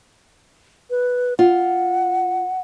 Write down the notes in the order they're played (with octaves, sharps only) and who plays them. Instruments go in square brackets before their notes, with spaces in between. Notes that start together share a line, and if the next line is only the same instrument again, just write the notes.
[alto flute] B4
[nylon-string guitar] F4 [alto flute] F#5